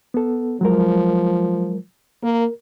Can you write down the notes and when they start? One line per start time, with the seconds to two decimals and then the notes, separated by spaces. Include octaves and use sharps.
0.14 B3 A4
0.61 F3 F#3 G#3 A#4
2.23 A#3 A#4